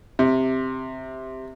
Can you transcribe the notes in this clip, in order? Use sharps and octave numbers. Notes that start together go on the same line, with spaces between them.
C3